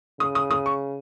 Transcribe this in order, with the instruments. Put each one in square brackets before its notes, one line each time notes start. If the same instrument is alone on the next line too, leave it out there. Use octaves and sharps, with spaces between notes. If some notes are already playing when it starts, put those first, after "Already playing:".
[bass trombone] C#3 [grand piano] D#6
[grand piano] D#6
D#6
C#6